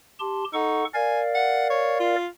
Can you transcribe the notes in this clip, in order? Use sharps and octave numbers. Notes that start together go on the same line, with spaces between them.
G4 A5 C6
D#4 A4 F#5 C#6
A#4 D5 F5 G#5
F#5
C#5
F4